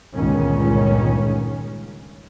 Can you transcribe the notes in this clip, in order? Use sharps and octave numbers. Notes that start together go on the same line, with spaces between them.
G1 C#2 A#2 D#3 C#4